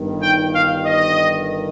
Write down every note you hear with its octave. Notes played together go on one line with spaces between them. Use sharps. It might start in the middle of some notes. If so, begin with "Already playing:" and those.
Already playing: G1 G2 D#3
G5
F5
D#5